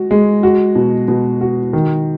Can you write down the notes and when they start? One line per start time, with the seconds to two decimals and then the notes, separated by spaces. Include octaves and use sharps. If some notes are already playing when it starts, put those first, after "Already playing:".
Already playing: G#3 F#4
0.11 G#3
0.43 F#4
0.76 B2
1.08 B2
1.41 F#4
1.73 D#3